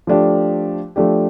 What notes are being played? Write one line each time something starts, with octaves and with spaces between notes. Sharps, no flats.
F3 A3 D4 G4
F3 A3 D4 G4